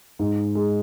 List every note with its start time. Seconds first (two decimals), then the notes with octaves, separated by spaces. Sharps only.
0.19 G#2
0.55 G#3